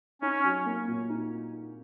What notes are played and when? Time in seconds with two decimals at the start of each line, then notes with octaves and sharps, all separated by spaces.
0.21 C#4 D#4
0.44 F#3
0.66 A#3
0.87 A#2
1.10 D#4